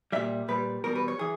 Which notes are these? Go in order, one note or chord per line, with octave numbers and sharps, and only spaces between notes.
A#2 G3 E5
A#2 G3 B4
E2 B2 G3 A#4
B4
C#5
E3 G#4